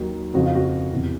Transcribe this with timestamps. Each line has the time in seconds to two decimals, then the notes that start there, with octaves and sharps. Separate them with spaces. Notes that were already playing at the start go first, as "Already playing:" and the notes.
Already playing: D#2 D#3 F#3
0.34 F2 C#3 F3 F#4
0.45 F4
0.55 F#4
0.91 E2 C3 E3